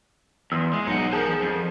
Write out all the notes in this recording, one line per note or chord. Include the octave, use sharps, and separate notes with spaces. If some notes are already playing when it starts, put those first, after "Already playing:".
E2 C6 D#6 E6
G#3
B1 D#4 F#5
G#4 A#4 C5 A5
F2